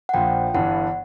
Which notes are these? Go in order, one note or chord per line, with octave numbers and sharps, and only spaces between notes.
F#5
A#1 A#2 F3 G5
G1 G2 E3 F#5